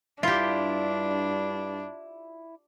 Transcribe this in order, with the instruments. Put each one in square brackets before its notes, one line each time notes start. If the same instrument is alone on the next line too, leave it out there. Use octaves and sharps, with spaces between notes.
[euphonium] G2 [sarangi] D4 [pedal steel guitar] E4 [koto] F4 G4